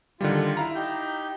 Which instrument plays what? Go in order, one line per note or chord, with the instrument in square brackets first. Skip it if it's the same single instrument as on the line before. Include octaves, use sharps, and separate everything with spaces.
[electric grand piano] D3 D#3 G3 [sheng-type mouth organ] F4
[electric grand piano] E4 F5 A#5
[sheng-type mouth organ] D#4 G4 G6